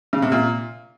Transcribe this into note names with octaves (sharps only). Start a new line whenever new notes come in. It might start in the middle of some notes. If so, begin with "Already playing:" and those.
C#3
C3
A#2